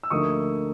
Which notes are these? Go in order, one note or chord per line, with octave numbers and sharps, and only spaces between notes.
E6
D2 D3 F3 A#3 D#4 C#6 D#6